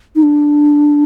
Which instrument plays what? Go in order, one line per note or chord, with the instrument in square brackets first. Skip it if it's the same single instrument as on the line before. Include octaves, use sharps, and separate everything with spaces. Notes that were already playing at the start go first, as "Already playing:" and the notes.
[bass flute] D#4
D4